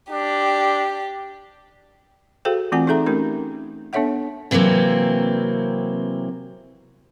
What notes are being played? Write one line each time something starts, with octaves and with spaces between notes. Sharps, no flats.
D4 G4
F#4 G#4 A4 C5 F5 G5
E3 A3 C4 F4 F#5 G#5
D#4 G#4 A4 E5 A#5
A3 C#4 D#4 G4 A#4
B3 D4 A4 C#5 E5 F#5
C3 E3 F#3 A#3 C4